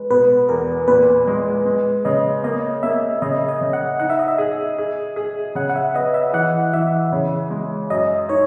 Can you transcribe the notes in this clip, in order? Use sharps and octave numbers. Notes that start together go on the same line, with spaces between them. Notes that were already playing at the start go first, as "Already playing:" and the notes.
Already playing: G#3 B4
B2 B4
E2 A#4
A#2 B4
G#3
G#3
C#3 D#5
A#3 D#5
A#3 E5
C#3 D#5
D#5
C#3
F#5
D#4 F#5
E5
D#5
E5
G#4
G#4
G#4
C#3 F#5
F#5
E5
B3 D#5
E5
E3 F#5
E3 E5
C#3
G#3
F#2 D#5
D#4 C#5